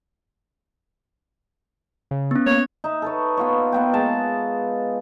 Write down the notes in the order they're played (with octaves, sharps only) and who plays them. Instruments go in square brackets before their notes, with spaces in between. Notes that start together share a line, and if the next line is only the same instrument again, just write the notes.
[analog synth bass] C#3
[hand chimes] B3 C#4
[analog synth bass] A#3 [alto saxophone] C#5
[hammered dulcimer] D#4 E5
A4 B4 C#5
B3 F4 C#5
A#3 B3 G5
G#3 A5 B5